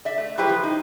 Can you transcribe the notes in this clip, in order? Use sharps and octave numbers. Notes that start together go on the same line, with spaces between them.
D5 E5
A3
F#3 E4 G4 B4 C5
E3 F3
D#4